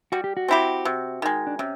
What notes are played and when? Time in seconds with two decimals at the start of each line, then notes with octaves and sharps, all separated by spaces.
0.12 G3 F#4
0.24 G4
0.37 F#4
0.48 C4 E4 G4
0.85 C3
1.22 D#3 G#3
1.47 D4
1.59 C3 C#4